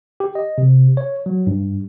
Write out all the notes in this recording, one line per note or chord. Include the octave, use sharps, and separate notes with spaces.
G4
D#5
C3
C#5
F#3
G2